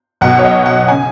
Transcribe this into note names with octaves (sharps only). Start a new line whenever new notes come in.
B1 B2 F#5
C#5
D#5
F#5
C#3 G#5